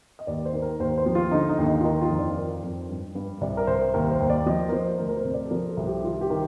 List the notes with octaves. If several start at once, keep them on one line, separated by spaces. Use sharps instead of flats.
D#5
D#2 D5
C5
D#3
A#4
D#2 C5
C5
F3
F4
D3 D#4
D#4
D#2
D#4
F4
D#3 D#4
F4
F2
D5
D#3
F2
G2
G2
C2 D5
A#4
C2 C5
D#2 A#4
C5
D#2
D5
F3 D#5
A#4
F3 C5
D2 A#4
A#4
C5
C3
D5
A4
F3 A#4
A4
C2
G4
D#3 F4
G4
D#3